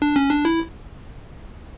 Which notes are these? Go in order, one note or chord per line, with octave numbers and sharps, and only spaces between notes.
D4
C#4
D4
E4